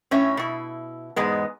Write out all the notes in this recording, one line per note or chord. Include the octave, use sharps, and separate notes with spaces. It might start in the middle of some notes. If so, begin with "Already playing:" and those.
A2 C#4 C#5 E5
B2 E4
E2 G#2 G#3 B3